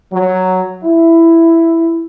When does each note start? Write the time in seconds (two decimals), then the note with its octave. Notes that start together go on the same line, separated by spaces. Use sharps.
0.12 F#3
0.83 E4